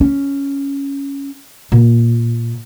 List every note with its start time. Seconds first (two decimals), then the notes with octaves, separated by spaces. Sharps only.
0.01 C#4
1.72 A#2